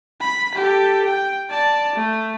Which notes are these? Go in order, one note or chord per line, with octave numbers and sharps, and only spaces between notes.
B5
G4 A4
G5
D5 A5
A3